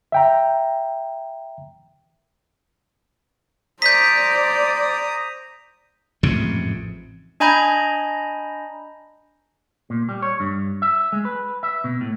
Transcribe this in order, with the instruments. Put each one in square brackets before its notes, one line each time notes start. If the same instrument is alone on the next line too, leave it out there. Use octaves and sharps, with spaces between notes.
[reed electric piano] E5 G5 A#5
[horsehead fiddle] C5 D5 [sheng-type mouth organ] A#5 D#6 [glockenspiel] G6 B6
[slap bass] A1 F2 G#2 C3
[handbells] D4 D#5 G#5 A#5 B5 G6
[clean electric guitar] A#2
G3
C#5
G2
E5
G#3
B4
E5
B2
A2